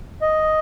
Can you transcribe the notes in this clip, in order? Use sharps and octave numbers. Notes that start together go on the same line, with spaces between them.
D#5